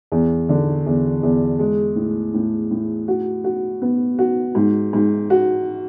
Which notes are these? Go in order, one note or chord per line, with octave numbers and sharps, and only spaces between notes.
E2
D3
E2
E2
G#3
A2
A2
A2
F#4
F#4
B3
F#4
G#2
G#2
F#4